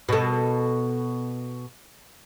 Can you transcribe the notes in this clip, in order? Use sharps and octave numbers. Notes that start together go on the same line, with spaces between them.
B2 A4